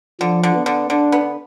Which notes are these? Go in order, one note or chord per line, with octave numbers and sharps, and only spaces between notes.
D3 F3
D3
B3
D3
D3 D4
B3